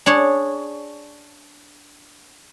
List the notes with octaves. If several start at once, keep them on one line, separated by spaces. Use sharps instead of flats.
D4 G#4 C#5